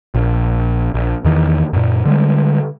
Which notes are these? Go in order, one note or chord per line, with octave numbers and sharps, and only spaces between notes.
A#1
A#1
E2 D#3 E3
F#2 A#2
D3 G3 G#3